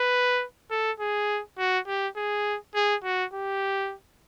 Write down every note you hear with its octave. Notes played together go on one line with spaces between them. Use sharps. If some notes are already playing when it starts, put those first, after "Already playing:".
Already playing: B4
A4
G#4
F#4
G4
G#4
G#4
F#4
G4